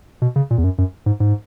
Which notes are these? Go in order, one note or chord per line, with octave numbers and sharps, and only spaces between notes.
B2
C#3
A#2
E2
F#2
F#2
G#2
G#2